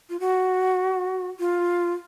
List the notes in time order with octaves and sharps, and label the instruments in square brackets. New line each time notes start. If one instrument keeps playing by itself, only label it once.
[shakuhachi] F4
F#4
F4